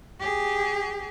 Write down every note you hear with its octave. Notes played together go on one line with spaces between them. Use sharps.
G4 G#4